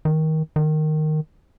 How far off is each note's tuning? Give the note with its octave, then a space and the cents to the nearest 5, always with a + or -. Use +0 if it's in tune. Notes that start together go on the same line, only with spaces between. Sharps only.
D#3 +20
D#3 -10